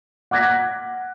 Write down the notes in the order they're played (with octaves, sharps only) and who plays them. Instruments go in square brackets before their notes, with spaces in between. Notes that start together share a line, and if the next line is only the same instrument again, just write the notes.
[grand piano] F#5 D6 F#6 G#6 A#6 B6